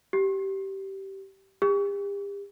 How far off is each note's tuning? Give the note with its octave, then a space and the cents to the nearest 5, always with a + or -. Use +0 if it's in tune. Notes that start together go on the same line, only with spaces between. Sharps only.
G4 -20
G4 +40